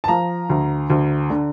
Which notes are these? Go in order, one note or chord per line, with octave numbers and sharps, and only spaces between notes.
A5
F3 A#5
D2
D2
D3